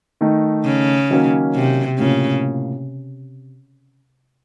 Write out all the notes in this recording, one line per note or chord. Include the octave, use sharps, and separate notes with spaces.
D#3 A3 D#4
C#3
D#3 F#3 A#3 C#4
C3
A2 C#3 F3 A#3